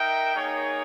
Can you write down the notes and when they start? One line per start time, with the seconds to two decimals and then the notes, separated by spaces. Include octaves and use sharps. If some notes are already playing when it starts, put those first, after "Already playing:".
Already playing: D#4 A#4 E5 G5
0.33 A#3 D#4 G#4 C#5